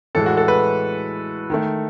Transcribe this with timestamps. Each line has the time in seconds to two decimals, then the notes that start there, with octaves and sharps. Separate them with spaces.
0.15 A2 E3 G#3 A4
0.26 F#4
0.37 A4
0.48 B4
1.50 D#3 A3